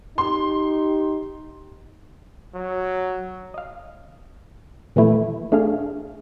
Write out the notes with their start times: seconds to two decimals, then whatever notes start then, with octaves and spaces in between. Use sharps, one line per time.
0.18 D#4 G4 C6
2.55 F#3
3.54 D#5 F5
4.96 A#2 E3 F3 A3 E4
5.52 A3 D4 G#4 F5